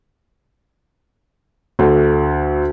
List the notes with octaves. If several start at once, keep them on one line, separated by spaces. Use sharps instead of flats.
D2 A4